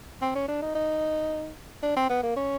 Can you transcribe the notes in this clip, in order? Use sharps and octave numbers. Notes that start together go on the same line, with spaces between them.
C4
C#4
D4
D#4
D#4
D4
C4
B3
A#3
C#4